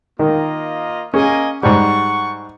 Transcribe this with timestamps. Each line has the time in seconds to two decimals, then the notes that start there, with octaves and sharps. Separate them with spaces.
0.19 D#3 A#3 F4 D#5
1.14 A#3 C#4 G#4 D#5 G#5
1.63 G#2 G3 F#5 C#6